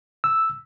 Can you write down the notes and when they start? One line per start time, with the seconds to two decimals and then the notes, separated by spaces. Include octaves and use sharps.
0.24 E6